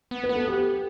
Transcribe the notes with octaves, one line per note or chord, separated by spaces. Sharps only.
B3
B4
B3
A4
G4